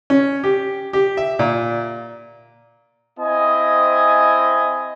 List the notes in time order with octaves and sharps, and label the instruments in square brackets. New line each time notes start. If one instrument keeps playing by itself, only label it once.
[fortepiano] C#4
G4
G4
E5
A#2
[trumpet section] C4 E4 D#5 G#5